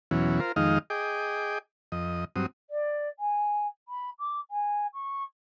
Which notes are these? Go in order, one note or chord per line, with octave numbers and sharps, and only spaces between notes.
E2 B2 E3 F#3 C#4
F4 A#4 C5
F2 D#3 G#3 D#4 D#5 F5
G#4 D#5 G5 D6
F2 D#5
G2 F#3 C4 D#6
D5
G#5
B5
D6
G#5
C#6